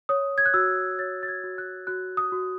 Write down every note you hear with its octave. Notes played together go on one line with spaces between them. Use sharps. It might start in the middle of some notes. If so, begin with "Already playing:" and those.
C#5 D#6
G#6
F#6
F#4 E6
C#5 A6
A6
G#6
F#4
F#6
F#4 F#6
D#6
F#4